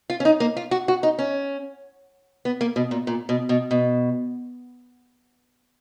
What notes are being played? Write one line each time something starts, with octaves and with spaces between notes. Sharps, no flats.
F4
C#4
D#4
A#3
F4
F#4
F#4
D#4
C#4
B3
A#3
B2
A#2
A#2
B2
B2
B2